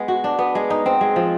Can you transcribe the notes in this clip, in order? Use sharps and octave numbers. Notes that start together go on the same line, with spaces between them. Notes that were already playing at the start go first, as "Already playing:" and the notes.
Already playing: G#3 B3
F#4
D4
B3
G#3
D#4
C4
G#3
F3